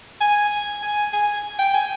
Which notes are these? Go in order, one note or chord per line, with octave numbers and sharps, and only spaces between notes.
G#5
G#5
G#5
G5
G#5